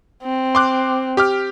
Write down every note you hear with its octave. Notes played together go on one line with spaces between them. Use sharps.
C4
C6 D6 F#6
G4 D6 F6